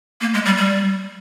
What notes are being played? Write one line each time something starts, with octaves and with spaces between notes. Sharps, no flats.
A#3
G#3
G3
G3